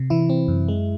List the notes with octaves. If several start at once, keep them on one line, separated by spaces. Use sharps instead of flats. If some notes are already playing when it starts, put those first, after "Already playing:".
Already playing: C3
E3 E4
C4
F#2
G#3